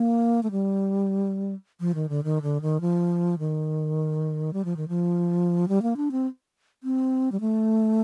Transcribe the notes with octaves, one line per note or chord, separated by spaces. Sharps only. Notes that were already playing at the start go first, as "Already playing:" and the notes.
Already playing: A#3
A3
G3
F3
D#3
D3
D#3
D3
D#3
F3
D#3
G3
F3
D#3
F3
G3
A#3
D4
C4
C4
G3
A3